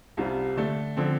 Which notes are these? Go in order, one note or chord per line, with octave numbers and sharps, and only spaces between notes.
C2 C3 G3 F4
D3 A3 D4 A4
D3 F3 C4 A4